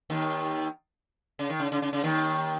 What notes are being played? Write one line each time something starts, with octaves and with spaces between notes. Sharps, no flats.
D#2 D#3
C#3
D#3
C#3
C#3
C#3
C#3
D#2 D#3